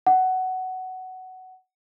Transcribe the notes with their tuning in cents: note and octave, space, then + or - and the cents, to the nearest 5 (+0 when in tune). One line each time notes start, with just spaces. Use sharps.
F#5 +10